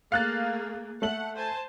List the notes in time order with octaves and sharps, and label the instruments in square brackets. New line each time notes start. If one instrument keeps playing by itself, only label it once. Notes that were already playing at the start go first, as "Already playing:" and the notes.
[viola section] A3 A#3 G#4 [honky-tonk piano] F5 F#6 A6
[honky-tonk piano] A3 E5 F#7 [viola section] F#5
[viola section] C5 G#5 A5